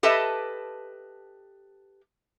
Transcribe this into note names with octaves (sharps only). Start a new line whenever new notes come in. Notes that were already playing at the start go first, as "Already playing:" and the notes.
G4 A4 B4 D#5 E5 A5